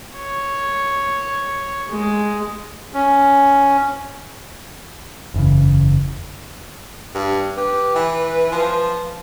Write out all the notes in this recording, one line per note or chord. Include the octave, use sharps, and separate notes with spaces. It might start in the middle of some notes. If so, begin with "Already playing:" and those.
C#5
G#3
C#4
F#1 E2 C#3
G2
G4 B4
E3
F3